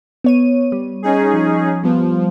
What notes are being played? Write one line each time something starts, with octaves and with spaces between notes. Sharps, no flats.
B3 C#5 D#7
G3
C#4 D#4 G#4
F3
F3 G3 B3